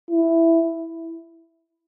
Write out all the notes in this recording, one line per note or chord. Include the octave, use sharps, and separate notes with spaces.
E4